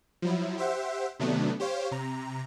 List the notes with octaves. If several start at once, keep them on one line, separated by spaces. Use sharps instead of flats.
F3 F#3 E4
G4 C5 E5 F#5
C3 D#3 F#3 A3 B3 D4
G4 C5 C#5 F5
C3 A#5